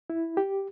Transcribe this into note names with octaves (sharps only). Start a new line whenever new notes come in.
E4
G4